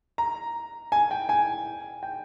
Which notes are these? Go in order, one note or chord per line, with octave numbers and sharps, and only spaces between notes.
A#5
G#5
G5
G#5
G5